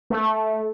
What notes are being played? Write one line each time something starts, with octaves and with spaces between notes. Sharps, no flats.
A3